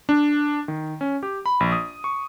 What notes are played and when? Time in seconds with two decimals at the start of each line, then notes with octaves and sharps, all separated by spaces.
0.09 D4
0.68 D#3
1.01 C#4
1.23 G4
1.46 B5
1.60 A#1
1.72 D#6
2.04 C#6